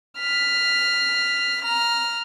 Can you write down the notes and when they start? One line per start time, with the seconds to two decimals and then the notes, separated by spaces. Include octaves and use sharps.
0.19 F6 B6
1.63 A#5 F6